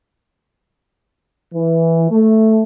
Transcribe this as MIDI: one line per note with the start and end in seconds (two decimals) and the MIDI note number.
1.53 2.09 52
2.10 2.61 57